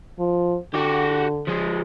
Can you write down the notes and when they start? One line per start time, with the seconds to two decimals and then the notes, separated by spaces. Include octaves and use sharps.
0.19 F3
0.74 D3 F#4 G4
1.48 F3 G#3